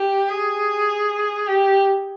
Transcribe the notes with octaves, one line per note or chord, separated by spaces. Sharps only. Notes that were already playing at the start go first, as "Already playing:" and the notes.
Already playing: G4
G#4
G4